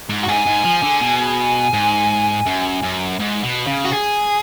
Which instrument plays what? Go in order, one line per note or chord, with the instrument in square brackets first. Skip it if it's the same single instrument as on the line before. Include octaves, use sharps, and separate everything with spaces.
[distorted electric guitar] G#2
[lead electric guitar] F#4
[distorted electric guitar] G#2 [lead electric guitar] G#4
[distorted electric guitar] G#2
F3
D3
B2
G#2
F#2
F#2
G#2
B2
C#3
[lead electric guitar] F#4
G#4